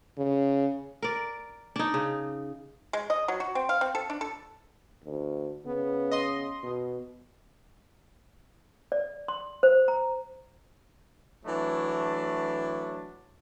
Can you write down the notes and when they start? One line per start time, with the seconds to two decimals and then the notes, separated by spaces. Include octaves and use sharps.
0.17 C#3
1.02 A#4 D5
1.76 D4 D#4
1.94 C#3
2.93 G#3
3.10 D#5
3.28 F#3
3.40 F#4
3.55 C4
3.69 F5
3.81 C4
3.95 A4
4.10 D4
4.21 A4
5.04 D2
5.66 C#3 B3
6.11 D#5 C6
6.63 B2
8.92 D5
9.28 C6
9.63 C5
9.88 A#5
11.46 E3 F#3 A3 D4